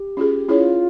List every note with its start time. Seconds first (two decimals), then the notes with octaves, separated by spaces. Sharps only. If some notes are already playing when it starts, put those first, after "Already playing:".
Already playing: G4
0.17 C#4 F4 G#4
0.48 C#4 E4 F4 G#4 C#5